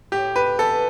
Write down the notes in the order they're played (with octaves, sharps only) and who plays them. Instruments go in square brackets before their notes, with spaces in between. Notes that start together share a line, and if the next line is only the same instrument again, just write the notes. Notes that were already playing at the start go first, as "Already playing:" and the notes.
[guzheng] A2 [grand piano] G4
[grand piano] B4
[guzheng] E3 B3 D4 [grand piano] A4